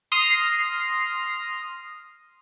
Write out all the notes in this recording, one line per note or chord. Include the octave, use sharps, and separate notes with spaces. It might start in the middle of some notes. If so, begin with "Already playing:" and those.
C6 D#6 F6 A#6 C7